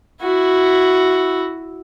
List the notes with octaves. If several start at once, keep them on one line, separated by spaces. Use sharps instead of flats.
E4 F#4